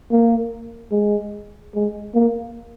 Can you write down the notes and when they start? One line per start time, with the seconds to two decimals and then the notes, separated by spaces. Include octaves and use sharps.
0.11 A#3
0.92 G#3
1.74 G#3
2.14 A#3